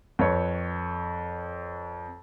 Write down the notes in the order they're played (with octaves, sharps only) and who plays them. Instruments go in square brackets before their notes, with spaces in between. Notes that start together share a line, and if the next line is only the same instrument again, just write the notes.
[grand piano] F2 B4 C#5